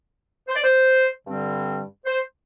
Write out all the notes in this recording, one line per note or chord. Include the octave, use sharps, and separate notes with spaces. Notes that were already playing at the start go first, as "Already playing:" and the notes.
C5
D5
C5
G2 D3 G3 C4
C5